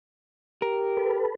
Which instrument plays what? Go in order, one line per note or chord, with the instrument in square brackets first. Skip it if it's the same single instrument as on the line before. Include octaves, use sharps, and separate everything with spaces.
[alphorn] G4 [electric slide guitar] A#4
[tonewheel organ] A4 B4